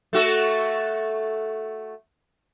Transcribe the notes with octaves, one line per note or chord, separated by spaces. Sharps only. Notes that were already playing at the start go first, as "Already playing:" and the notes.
A3 F#4 A4